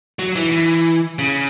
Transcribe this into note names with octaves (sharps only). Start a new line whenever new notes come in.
F#3
E3
E3
C#3